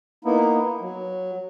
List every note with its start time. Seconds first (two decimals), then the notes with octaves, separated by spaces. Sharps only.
0.25 A#3 B3 D#4 E4
0.81 F#3